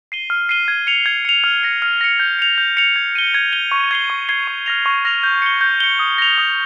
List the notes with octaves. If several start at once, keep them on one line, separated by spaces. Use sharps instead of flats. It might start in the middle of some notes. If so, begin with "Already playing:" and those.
C7 D#7 G7
F6
C7 D#7 G7
G#6
C#7 F7
G#6
C#7 F7
F6
A#6 C#7
F6
A#6 C#7
G6
C#7 F7
G6
C#7 F7
G#6
D#7 G7
G#6
D#7 G7
C#6
G#6 C7 G7
C#6
G#6 C7 G7
C#6
F6 A#6 F7
C#6
F6 A#6 F7
G6
C#7 G7
G6
C#7 G7
D#6
A#6 F7
D#6